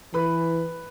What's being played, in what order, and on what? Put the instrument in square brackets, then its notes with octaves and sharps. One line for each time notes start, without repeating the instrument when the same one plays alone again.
[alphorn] E3 [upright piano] B4 B5